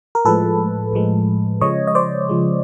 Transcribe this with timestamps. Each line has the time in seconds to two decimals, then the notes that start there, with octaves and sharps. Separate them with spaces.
0.15 A#4
0.25 A2 F3 G#3 A4 B4
0.93 A2 F3 G#3
1.61 C#3 F3 G#3 C#5 D#5
1.87 D#5
1.95 C5 D5
2.29 C#3 F3 G#3